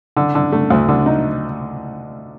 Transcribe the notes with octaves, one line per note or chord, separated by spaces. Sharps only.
D3
D3
A3
D2
D3
D#4